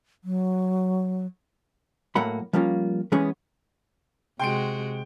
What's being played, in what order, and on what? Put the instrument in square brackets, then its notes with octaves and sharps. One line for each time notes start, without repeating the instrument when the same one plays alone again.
[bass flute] F#3
[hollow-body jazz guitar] A2 F#3 A#3 F#5 B5
F3 G3 A#3 C#4 F4
E3 G#3 B3 C#4 G#4
[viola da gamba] C3 G#3 F#4 [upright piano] G5 C6 D7